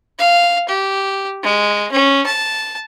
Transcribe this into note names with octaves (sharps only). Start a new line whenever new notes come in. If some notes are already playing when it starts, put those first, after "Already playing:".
F5
G4
G#3
C#4
A5